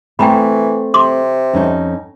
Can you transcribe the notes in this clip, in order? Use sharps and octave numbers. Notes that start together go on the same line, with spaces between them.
E3 A3 C4 G5 A#5 B5
C3 C6 D6
F2 C#4 D#4